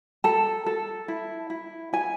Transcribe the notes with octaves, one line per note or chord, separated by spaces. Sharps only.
A4 A5
A4
E4
E4
E4 G#5